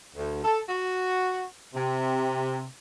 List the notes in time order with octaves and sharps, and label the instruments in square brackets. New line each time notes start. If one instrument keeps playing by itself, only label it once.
[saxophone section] D2
A4
F#4
C3